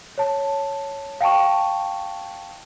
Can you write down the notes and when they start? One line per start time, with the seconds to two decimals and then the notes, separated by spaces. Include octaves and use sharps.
0.18 C#5 A5
1.21 F5 G5 A5 C#6